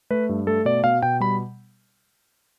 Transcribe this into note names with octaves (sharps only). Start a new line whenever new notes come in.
A3 B4
G2
A3 A4
B2 D5
B2 F5
B2 G5
G3 B5